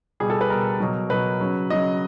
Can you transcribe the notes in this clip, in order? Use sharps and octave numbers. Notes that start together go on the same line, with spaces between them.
B2 G3 G#4
A4
B4
B2 G3 A#4
B2 F#3
B2 F#3 B4
C#3 F#3
C#3 F#3 D#5